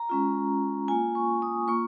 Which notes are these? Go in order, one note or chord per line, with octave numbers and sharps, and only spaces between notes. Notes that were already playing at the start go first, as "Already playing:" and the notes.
Already playing: A#5
G#3 C#4 F4
A#3 F4 G#5
C#6
D#6
A#3 F4 C#6